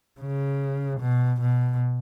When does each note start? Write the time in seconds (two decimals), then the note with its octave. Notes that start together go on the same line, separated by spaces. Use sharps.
0.20 C#3
1.00 B2
1.41 B2